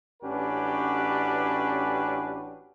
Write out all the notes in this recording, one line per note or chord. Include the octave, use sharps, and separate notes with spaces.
A1 C#4 D4 F#4 G4 B4